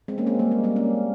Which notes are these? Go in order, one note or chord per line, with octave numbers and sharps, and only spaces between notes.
G#3 C4
A#3 C#4
G#3 C4
G3 A#3
G#3
G3 A#3
A#3 C#4